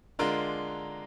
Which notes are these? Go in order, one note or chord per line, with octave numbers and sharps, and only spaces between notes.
D3 G#3 D4 F4 A#4